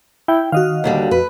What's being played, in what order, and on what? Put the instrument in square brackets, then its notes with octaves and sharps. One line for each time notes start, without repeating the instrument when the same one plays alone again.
[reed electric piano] E4 [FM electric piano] G5
[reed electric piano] D#3 [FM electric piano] F#4 D#5 F5
[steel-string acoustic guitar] D#2 D3 G3
[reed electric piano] F2 [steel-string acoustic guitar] B4